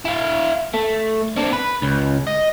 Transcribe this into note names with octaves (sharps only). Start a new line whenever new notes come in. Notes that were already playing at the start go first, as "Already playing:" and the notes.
E4 F5
A3
C4 D4
B4
C#2
D#5